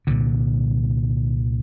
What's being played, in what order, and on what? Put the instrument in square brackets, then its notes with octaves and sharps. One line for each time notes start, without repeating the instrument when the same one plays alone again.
[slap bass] C2 A#2 D3